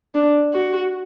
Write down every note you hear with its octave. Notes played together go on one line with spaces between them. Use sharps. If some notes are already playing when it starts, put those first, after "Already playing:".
D4
F#4